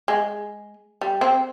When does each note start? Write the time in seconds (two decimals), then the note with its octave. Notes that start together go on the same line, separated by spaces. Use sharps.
0.08 G#3
1.01 G3
1.21 C4